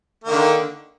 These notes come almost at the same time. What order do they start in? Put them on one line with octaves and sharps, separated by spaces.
A#3 D#3 D3